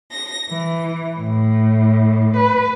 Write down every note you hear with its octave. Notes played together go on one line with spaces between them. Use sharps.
A#6
E3
A2
B4